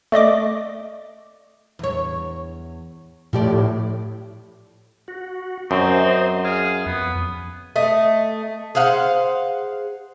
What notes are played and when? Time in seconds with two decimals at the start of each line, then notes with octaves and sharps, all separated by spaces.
0.12 A3 D5 D#5 D6
1.79 E2 C#5
3.33 A2 F3 G4 D5
5.08 F#4
5.71 F#2 C4 C5 D#5
6.45 G#4 F5
6.86 F2 B3
7.76 A3 D#5
8.75 G#4 C5 F5 F#5